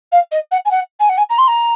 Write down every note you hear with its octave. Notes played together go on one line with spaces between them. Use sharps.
F5
D#5
F#5
G#5
F#5
G#5
F#5
G#5
A#5
C6
A#5